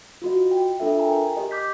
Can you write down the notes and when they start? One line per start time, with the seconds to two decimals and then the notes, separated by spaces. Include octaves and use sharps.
0.22 F4 F#4 D#5
0.51 G5
0.80 D4 F4 A4 E5
0.99 A#4 G5 G#5 A#5
1.37 G4 D#5
1.51 D6 G6 B6